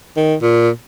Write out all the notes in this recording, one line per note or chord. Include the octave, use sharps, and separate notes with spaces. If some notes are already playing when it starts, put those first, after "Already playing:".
D#3
A#2